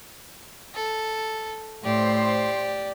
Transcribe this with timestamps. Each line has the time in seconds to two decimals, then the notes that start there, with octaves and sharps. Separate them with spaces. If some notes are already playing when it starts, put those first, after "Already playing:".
0.75 A4
1.85 A2 G4 C5 D5